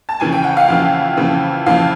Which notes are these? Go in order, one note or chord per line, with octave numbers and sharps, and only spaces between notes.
A5
F2 C#3 E3 G#5
G5
F#5
F5
F2 C#3 E3
F2 C#3 E3
F2 C#3 E3 F5